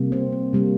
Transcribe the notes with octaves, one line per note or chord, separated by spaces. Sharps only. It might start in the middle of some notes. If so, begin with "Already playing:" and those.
Already playing: C3 G3 A#3
C4
A#3
C3 G3 A#3